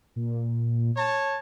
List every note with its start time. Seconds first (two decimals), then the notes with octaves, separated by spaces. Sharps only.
0.16 A#2
0.97 C#5 A5